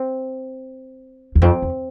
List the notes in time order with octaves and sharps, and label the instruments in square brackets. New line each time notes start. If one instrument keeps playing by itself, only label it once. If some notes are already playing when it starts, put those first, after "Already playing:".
Already playing: [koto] C4
[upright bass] E2
[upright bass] F2 [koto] C4
[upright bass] E2